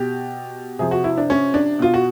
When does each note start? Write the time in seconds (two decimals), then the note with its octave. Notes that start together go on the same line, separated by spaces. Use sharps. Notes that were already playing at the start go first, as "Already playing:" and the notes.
Already playing: B2 G4
0.79 C3 F3 G#4
0.91 F#4
1.04 E4
1.18 D4
1.30 C#4
1.54 D4
1.79 B2 F4
1.94 F#4